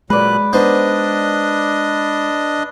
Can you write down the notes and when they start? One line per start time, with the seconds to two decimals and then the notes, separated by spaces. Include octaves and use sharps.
0.10 A#2 F#3 G#3 B4 D5 F#6
0.53 B3 D4 D#4 C5 D#5